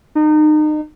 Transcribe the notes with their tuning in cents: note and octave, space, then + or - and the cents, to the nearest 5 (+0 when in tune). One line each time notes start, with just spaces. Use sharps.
D#4 -30